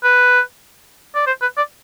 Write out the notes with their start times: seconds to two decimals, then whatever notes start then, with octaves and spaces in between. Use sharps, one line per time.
0.03 B4
1.15 D5
1.27 C5
1.42 B4
1.57 D5